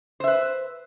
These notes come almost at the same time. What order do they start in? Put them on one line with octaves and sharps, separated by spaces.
C5 E5 B4